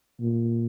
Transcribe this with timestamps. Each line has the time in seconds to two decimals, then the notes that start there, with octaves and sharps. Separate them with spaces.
0.20 A#2